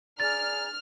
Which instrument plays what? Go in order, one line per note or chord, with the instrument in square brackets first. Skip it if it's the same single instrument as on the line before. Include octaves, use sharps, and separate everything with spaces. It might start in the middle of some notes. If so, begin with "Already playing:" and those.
[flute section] G#4 D5 A#5 [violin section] F6 [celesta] A6